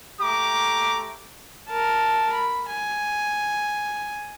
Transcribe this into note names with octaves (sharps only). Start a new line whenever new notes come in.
A3 G4 A#5 D6
A#4 A5
B5
G#5